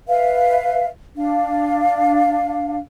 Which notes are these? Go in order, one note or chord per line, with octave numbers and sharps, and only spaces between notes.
B4 E5 F5
D4 F5